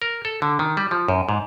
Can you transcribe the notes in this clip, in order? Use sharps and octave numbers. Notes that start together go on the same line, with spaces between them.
A#4
A4
D3
D#3
G3
F3
F#2
G#2